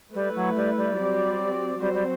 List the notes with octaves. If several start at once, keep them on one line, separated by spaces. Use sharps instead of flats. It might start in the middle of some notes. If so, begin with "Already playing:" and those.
G3 A3 E4 B4
F#3
G3
G3
F#3 C4 G4 D5
F#3 G3 C4 F#4 C5
G3